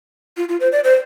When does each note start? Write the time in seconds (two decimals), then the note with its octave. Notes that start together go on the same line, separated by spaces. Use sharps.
0.37 F4
0.49 F4
0.60 C5
0.72 D5
0.84 C5